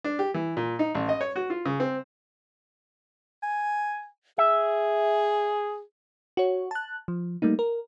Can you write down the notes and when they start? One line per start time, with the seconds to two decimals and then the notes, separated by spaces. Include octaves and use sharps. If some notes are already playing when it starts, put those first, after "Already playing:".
0.04 D4
0.19 G4
0.34 E3
0.57 A#2
0.79 D#4
0.95 A1
1.09 D#5
1.21 C#5
1.36 F#4
1.50 F4
1.66 C#3
1.80 C4
3.43 G#5
4.38 G#4 E5
6.37 F#4 C#5
6.71 A5 F#6
7.08 F3
7.42 G3 A3 A#3 D#4
7.59 A#4